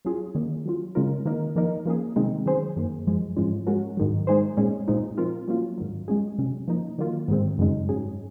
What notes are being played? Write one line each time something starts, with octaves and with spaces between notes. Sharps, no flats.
F#3 C#4 F4 G#4
D#3 A#3 C#4
F#3 C#4 F4
C#3 G#3 C#4 F4 A#4
D#3 A#3 D#4 A#4
F3 A#3 D#4 A#4
F3 A#3 C#4 G#4
C3 D#3 G#3 C4 D#4
D#3 F#3 C#4 G#4 C5
F#2 D#3 A#3
F#2 F3 G#3
G#2 F3 G#3 C#4 F4
G#3 C#4 F#4 A#4
G#2 D#3 F#3
G#3 D#4 G#4 C5
A#2 G#3 C#4 G#4
A#2 G#3 C4 D#4
F3 C4 F4 A#4
F#3 A#3 C#4 F4
G#2 D#3 F#3
G#3 C#4 G#4
C3 F#3 C#4
F3 A#3 D#4
D#3 F#3 A#3 F4
G#2 D#3 G#3 C4
F#2 C#3 G#3 D#4
G#2 F#3 C#4 G#4